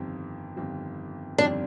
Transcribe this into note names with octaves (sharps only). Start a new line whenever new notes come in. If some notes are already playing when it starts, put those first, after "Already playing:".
Already playing: G1 F2 D#3 G3 C4
G1 F2 D#3 G3 C4
G1 F2 D#3 G3 C4 D4